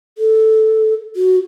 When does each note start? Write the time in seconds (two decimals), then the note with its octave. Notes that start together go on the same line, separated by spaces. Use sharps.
0.18 A4
1.16 F#4